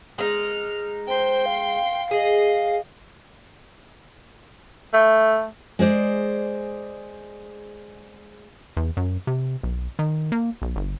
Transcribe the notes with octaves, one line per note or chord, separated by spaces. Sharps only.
G#3 D#4 F6
C5 G5 C6
F5
G#4 D#5 C7
A3
G#3 G#4 C5 D5
E2
F#2
C3
B1
D#3
A#3
B1
G1